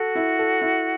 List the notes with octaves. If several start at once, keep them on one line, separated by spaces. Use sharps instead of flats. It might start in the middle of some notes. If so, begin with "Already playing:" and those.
Already playing: F#4 A4
E4
A4
E4